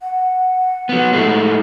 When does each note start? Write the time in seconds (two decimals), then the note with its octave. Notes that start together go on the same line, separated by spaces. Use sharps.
0.01 F#5
0.89 F#3 B3
1.13 A2 G#3 A3